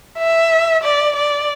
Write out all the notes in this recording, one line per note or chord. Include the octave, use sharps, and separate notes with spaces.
E5
D5
D5